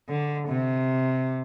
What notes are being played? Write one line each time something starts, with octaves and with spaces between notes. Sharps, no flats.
D3
C3